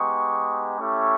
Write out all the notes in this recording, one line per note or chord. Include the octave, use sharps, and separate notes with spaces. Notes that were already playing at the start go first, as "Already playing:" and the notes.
Already playing: G#3 B3 D#4 G4 C#6
A3 C#4 E4 G4 C#6